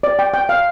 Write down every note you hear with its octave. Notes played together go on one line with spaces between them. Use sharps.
D5
G5
G5
F5